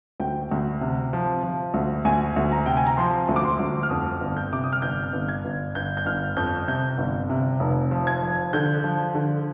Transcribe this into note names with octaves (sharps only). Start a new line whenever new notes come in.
D2 G5
D2
C3
F3
F3
D2
D2 G#5
D2
A#5
C3 G5
G#5
A#5
F3 C6
D2
D6
C6
D2
F6
F2 D#6
G1
G6
C3 D6
D#6
F6
G1 G6
G1
G#6
G1
G1 G6
G6
G1 F6
F2 G6
C3 G6
G1
C3
F1
F3
G#6
F3
D3 G6
F3
D3